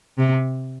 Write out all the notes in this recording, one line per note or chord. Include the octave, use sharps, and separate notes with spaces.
C3